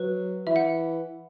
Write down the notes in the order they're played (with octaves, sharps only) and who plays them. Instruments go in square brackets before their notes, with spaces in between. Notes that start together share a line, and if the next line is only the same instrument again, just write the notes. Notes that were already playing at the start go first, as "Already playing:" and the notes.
Already playing: [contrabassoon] F#3 [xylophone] B4
[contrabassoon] E3 [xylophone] E5
[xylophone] F#5